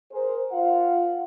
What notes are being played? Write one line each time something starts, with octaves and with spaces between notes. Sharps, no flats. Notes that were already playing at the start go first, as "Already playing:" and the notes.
G#4 A#4 C5
F4 F5 F#5